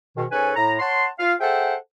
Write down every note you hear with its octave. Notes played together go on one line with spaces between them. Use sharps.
G#2 B2 D#3
G#2 C#4 A4 B4 C#5 G#5
A2 A#5
C#5 F#5 A5 C6
F4 F5
G#4 A4 C5 E5 F#5 G5